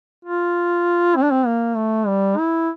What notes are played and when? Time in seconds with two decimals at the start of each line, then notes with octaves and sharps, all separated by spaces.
0.25 F4
1.16 C4
1.23 D4
1.31 C4
1.46 A#3
1.76 A3
2.07 G3
2.38 E4